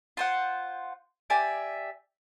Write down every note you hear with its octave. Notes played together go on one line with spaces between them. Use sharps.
F4 C5 F#5
G4 D5 E5 G#5